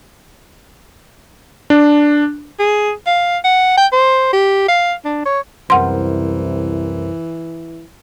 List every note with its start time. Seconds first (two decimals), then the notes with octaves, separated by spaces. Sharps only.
1.70 D4
2.59 G#4
3.07 F5
3.44 F#5
3.77 G5
3.92 C5
4.33 G4
4.68 F5
5.05 D4
5.26 C#5
5.70 C2 F#2 E3 A#4 C5 F#5 C6